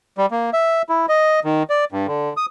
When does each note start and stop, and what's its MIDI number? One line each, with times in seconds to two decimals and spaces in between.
0.18 0.26 55
0.31 0.50 58
0.53 0.82 76
0.89 1.06 64
1.09 1.40 75
1.44 1.63 51
1.70 1.85 74
1.92 2.07 43
2.07 2.33 50
2.37 2.46 87